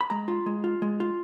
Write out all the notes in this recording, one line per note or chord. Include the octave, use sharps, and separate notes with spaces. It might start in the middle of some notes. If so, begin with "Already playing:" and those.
B5
G#3 A#5
F4
G#3
F4
G#3
F4